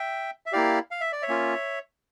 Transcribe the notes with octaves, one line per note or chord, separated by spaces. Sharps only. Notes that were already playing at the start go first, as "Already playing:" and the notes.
Already playing: E5 G5
E5
A#3 E4 G4 D5 F5
F5
E5
D5
C#5 E5
A#3 C#4 F4